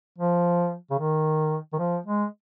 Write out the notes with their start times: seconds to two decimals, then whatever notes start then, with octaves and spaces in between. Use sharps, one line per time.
0.18 F3
0.91 C#3
0.99 D#3
1.73 D#3
1.79 F3
2.06 G#3